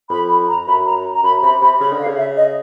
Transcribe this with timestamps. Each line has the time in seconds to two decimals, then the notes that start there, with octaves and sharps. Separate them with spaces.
0.10 F2 B5
0.29 B5
0.48 A#5
0.67 F#2 B5
0.86 A#5
1.14 A#5
1.23 F#2 B5
1.42 C3 B5
1.62 C3 B5
1.80 C#3 B5
1.93 D3
1.99 F5
2.07 C#3
2.17 E5
2.37 D#5